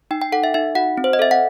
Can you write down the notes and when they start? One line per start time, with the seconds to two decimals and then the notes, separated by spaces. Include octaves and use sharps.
0.11 D#4 G5
0.21 G5
0.32 A4 F#5
0.44 E5
0.54 D#4 E5
0.75 F#4 F#5
0.98 C4
1.04 C5
1.13 D#5
1.19 A4 E5
1.31 F#5